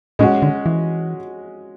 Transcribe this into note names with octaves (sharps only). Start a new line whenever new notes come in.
A2 G#3 C#4 F#4
D3
E3